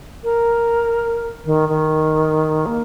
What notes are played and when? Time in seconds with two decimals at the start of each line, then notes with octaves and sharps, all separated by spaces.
0.24 A#4
1.46 D#3
1.69 D#3
2.66 A#3